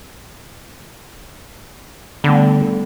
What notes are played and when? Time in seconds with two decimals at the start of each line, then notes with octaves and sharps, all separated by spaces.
2.24 D3 G3 A3 B3